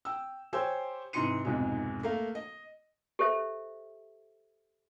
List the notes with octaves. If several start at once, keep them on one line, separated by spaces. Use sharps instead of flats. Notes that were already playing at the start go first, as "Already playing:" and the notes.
G5 E6
G4 C5 C#5 G#5 C6 E6
G#2 C3 E3 C6 C#7 D#7
B1 F2 G#2 C3 G#3
A3 A#3 A#4 F5
D#5
G4 A4 C5 E5